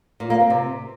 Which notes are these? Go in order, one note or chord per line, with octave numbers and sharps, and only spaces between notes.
A#2
A#3
C4
C3